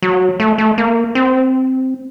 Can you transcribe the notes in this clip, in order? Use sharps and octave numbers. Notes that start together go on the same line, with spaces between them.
F#3
A3
A3
A#3
C4